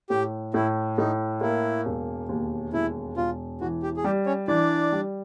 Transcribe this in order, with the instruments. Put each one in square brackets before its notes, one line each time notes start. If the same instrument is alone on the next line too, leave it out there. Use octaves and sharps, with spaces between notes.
[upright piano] A2 [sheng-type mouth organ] G4
[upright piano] A2 [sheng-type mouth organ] E4
[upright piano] A2 [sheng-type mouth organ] D#4
[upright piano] A#3 [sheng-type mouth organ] E4
[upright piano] E1
D#2
[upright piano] E1 [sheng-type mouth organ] E4
[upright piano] E1 [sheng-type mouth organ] F4
[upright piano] E3 [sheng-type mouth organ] F#4
[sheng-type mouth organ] G4
G#4
[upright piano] G3 [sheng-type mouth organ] G4
[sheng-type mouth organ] C#4 C#5
[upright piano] E3 [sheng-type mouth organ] D4 D5
[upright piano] G3